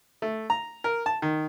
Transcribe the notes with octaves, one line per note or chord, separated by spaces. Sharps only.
A3
A#5
A#4
A5
D#3